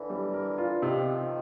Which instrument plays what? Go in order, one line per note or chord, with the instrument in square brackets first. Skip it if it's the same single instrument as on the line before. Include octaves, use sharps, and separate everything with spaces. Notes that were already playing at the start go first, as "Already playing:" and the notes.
Already playing: [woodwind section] D3 E3
[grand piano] G3
A#4
F4
[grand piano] C3 [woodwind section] D#3 F3